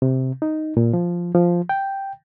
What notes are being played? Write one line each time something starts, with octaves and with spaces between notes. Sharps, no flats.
C3
D#4
A#2
F3
F3
G5